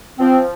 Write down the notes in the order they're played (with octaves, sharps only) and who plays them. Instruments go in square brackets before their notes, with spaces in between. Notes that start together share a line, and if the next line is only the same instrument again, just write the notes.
[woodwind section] F3 C4